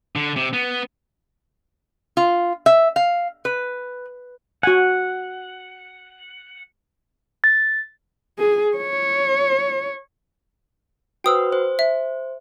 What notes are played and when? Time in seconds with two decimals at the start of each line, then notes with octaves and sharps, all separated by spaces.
0.16 D3
0.36 C3
0.53 B3
2.17 F4
2.66 E5
2.96 F5
3.45 B4
4.63 F#4 F#5 G#5
7.44 A6
8.39 G#4
8.77 C#5
11.24 F#4 B4 C5 G5 D#6 E6
11.52 C5
11.79 E5